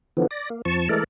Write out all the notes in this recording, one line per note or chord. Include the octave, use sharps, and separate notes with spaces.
D3 E3 F3 B3
D5 A#6
A#3
F2 F3 A5 C#6
E3 G#3 A3 A4 A#4 D5